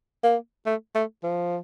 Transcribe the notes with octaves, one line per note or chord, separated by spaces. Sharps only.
A#3
A3
A3
F3